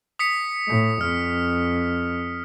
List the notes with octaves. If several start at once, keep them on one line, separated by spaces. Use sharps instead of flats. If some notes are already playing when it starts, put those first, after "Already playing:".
D#6 B6 C#7
A2
F2 F6